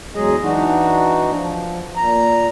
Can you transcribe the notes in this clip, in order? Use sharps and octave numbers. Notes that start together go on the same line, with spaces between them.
E2 F#3 G#3 G#4 D#5
E3 D4 D#4 F#4
F3
A#2 A#5